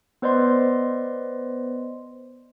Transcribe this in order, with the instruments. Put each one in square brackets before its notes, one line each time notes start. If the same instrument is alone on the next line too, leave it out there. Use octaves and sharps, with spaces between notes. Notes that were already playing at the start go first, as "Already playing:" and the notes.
[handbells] B3 B4 C5 D5 D#5 C6